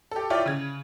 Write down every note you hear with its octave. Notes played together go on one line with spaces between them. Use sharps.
G4 A4
E4 F4 C#5 D5 E5 G5
C#3 G#6